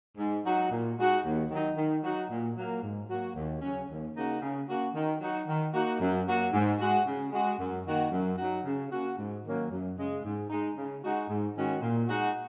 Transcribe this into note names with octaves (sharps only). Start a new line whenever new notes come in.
G#2
F#3 D#4 F#4
A#2
G#3 D#4 F#4
D#2
D#3 F#3 D#4
D#3
F#3 D#4 F#4
A#2
F#3 A#3
G#2
F#3 A#3 F#4
D#2
C#3 F#3 C#4
D#2
C#3 A#3 D#4 F#4
C#3
A#3 C#4 F#4
D#3
F#3 D#4 F#4
D#3
A#3 D#4 F#4
F#2
F#3 A#3 F#4
G#2
G#3 F#4
C#3
G#3 F#4
F#2
D#3 A#3 F#4
F#2
F#3 D#4 F#4
C#3
A#3 C#4 F#4
G#2
D#3 F#3 A#3 C#4
F#2
C#3 G#3
G#2
G#3 D#4
C#3
G#3 D#4 F#4
G#2
D#3 G#3 C#4 F#4
A#2
G#3 D#4 F#4